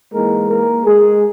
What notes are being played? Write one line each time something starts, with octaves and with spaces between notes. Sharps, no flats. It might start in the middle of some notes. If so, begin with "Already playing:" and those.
G#2 E3 G#3 A#3 A#4
A#3 A#4
G#3 G#4